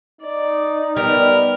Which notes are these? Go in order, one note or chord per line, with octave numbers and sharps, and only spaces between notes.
D#4 D5
G3 B3 A#4